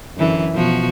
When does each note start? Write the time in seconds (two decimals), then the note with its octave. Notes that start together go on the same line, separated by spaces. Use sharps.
0.17 F#2 D3 E3
0.53 B2 F3 F#4